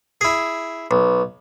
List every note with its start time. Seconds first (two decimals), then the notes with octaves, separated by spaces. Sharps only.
0.21 E4 G#4
0.91 B1